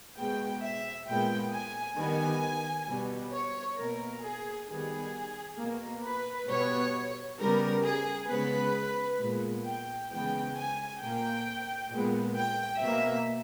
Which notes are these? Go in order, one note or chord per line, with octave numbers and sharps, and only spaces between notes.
B2 G#3 B3 G5
E5
A#2 G#3 B3 G5
G#5
D#3 G3 B3 G#5
B2 G3 B3
C#5
B2 A#3 A#4
G#4
D#3 G3 B3 G#4
B2 A#3
B4
B2 G3 B3 C#5
C#3 G3 B3 A#4
G#4
C#3 G#3 B3 B4
A#2 G#3 B3
G5
C#3 E3 G#3 B3 G5
G#5
A#2 A#3 G5
A#2 G#3 B3
G5
B2 A#3 E5